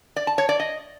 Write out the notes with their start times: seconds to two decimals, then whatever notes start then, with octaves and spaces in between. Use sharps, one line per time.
0.16 D5
0.27 A5
0.38 C#5
0.49 D5
0.60 D#5